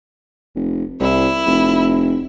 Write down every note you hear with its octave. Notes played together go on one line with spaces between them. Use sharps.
F1
C2 E4
F1